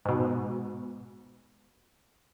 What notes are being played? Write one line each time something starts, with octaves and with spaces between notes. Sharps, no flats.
G#2 B2